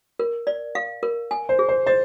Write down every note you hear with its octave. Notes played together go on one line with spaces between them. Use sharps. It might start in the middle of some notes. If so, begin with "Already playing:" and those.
A#4
D5
F5
A#4
G#5
C5
G#4
C5
C5 D#5